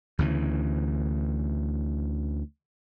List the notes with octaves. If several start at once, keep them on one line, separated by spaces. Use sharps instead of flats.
D2 C#3 E3